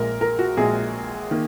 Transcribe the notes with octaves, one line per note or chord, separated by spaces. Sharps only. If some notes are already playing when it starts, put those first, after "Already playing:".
Already playing: A#1 A#2 G#3 A#4
A#4
F#4
A#1 A#2 G#3 G#4
D#3 A#3